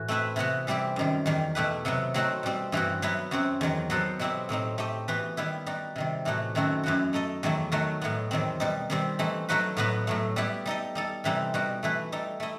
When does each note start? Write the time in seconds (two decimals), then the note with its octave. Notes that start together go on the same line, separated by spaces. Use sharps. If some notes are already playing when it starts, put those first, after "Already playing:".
Already playing: A2 E3 F#4
0.08 A3 C4 E4 B4 E5
0.36 C3 E3 B3 F#4
0.67 E3 G3 C4 E4 G4
0.96 F#2 D#3 G3
1.26 E2 D#3 G3
1.55 B2 A3 E4 G4 B4
1.85 C3 F#3 B3
2.14 F#3 A3 C4 D#4 F#4
2.43 B2 G3 C4
2.72 G2 E3 G3 C4 F#4
3.02 F#3 B3 E4 B4
3.31 F#2 F#3 C4 F#4
3.61 E2 D#3 F#3
3.90 F#3 B3 F#4 A4 C5
4.19 B2 F#3 C4 E4 G4
4.49 A2 F#3 C4 D#4
4.78 A3 D#4 G4 D#5
5.08 E3 B3 F#4 B4
5.37 D#3 G3 B3 E4
5.66 G3 D#4 F#4
5.96 C3 D#3 G3
6.25 A2 E3 A3 D#4 F#4
6.55 F#2 D#3 A3 C4 F#4
6.83 F#2 E3 B3 F#4
7.13 A3 D#4 A4 D#5
7.43 E2 D#3 F#3 A3 E4
7.72 D#3 F#3 A3 D#4 F#4
8.01 A2 F#3 B3
8.31 E2 D#3 F#3 C4
8.60 B2 G3 D#4
8.90 D#3 G3 C4
9.19 E3 A3 D#4
9.49 F#3 A3 D#4 F#4 B4
9.77 A2 F#3 B3 F#4 B4
10.07 A2 F#3 A3
10.36 G3 B3 E4 G4
10.66 G3 D#4 A4 D#5
10.95 G3 D#4 A4
11.24 C3 E3 G3 C4 D#4
11.54 B2 G3 D#4 F#4
11.83 E3 A3 E4 B4
12.12 G3 D#4 A4
12.40 A3 E4 D#5